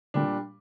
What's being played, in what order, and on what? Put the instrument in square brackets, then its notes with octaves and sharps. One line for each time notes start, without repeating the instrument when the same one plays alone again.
[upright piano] A#2 G3 D4 [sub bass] D3